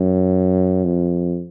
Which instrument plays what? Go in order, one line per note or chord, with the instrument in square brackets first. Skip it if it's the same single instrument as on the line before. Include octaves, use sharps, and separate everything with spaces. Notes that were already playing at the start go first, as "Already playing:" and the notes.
Already playing: [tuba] F#2
F2